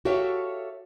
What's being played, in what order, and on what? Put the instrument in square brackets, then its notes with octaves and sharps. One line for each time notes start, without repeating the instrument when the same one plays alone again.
[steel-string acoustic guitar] F#4 G4 A4 C#5 E5 F5